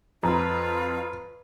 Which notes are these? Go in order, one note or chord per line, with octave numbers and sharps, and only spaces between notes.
F2 F4 B4 A#5